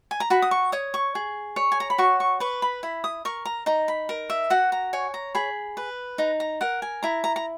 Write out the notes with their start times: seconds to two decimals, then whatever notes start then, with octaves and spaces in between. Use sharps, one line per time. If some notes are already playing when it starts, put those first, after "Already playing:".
0.11 G#5
0.20 A#5
0.30 F#4 B5
0.42 D#6
0.51 C#6
0.72 C#5 D#6
0.94 C#6
1.15 G#4
1.56 C#5
1.72 G#5
1.80 A#5
1.90 B5
1.98 F#4 C#6
2.20 C#6
2.40 B4 C#6
2.62 B5
2.83 E4 B5
3.04 D#6
3.25 A#4 C#6
3.45 A#5
3.66 D#4 A#5
3.88 B5
4.09 A#4
4.30 E5
4.50 F#4 F#5
4.72 A#5
4.93 C#5 G#5
5.14 A#5
5.35 G#4 B5
5.77 B4
6.18 D#4 A#5
6.40 A#5
6.61 A#4 F#5
6.82 G#5
7.03 E4 A#5
7.24 A#5
7.36 A#5